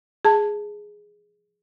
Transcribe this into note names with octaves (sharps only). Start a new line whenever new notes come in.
G#4 A5